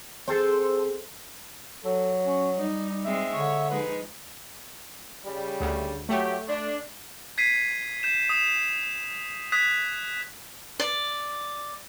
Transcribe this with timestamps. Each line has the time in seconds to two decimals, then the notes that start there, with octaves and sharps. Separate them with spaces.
0.28 C4 G#4 A4 C5
1.85 F#3 A4
2.25 C#4
2.57 G3 D#4
3.05 G#3 C4 E5
3.34 D3 C#5
3.70 F3 G#3 D#4 B4
5.25 C#3 G3
5.60 D2
6.09 F#3 A3 G4
6.48 D4
7.38 G#6 B6 C7 D#7
8.03 G6 E7
8.29 D#6 E7
9.52 D#6 F#6 G#6 B6
10.80 D5